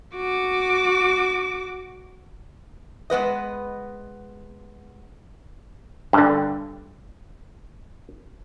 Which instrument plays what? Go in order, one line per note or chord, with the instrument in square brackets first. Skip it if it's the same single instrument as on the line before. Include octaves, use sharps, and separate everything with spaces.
[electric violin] F#4 D6
[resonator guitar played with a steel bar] G#3 B3 B4 D#5
[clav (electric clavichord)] G2 D3